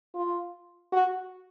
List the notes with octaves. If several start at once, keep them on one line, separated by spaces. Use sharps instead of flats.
F4
F#4